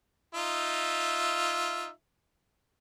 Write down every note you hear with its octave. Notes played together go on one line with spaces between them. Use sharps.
D#4 F4 E5